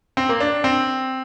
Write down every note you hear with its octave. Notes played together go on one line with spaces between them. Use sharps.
C4
A#3
D4
C4